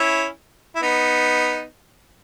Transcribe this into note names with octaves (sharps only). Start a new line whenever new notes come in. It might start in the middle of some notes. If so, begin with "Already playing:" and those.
Already playing: C#4 E4
E4
B3 D#4